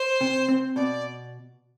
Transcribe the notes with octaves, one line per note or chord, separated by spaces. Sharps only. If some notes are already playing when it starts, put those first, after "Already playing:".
Already playing: C5
C3
C4
B2 D5